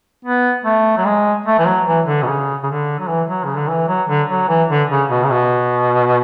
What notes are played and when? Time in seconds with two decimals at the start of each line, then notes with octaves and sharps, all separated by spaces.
0.25 B3
0.65 A3
0.98 F#3
1.06 G#3
1.46 A3
1.59 E3
1.66 F#3
1.87 E3
2.06 D3
2.23 B2
2.27 C#3
2.63 C#3
2.67 D3
2.99 F#3
3.08 E3
3.28 F#3
3.45 C#3
3.57 D3
3.69 E3
3.88 F#3
4.08 D3
4.30 F#3
4.49 E3
4.69 D3
4.90 C#3
5.09 B2
5.23 C#3
5.30 B2